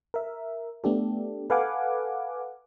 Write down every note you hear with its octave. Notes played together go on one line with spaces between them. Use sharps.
A#4 E5
A3 B3 D4 G4 A4
A4 B4 F5 F#5 G#5 D6